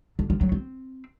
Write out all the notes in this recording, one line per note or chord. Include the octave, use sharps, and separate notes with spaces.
D3
F3
F#3
C4